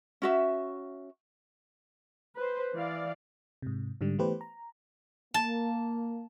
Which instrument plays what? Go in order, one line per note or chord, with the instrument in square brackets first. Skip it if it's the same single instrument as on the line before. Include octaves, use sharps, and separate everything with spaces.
[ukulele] C#4 F#4 E5
[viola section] B4 C5
E3 D5 F5
[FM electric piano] G#2 C3
G#2 D3 G3
E3 A3 B3 G4 B4 C5
A#5
[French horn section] A#3 [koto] A5